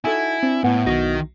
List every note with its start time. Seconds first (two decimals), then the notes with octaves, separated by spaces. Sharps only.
0.05 D#4 E4 F#4 A4 G#5
0.43 C4 D4
0.64 A2 B3 E4 C5 F#5
0.86 B1 D#3 D#4 F#4 A#6